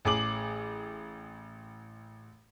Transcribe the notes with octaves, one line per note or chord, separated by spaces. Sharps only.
A1 G#4 D6 F#7